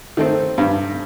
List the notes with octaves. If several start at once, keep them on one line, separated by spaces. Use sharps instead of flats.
D#3 A3 C4
G2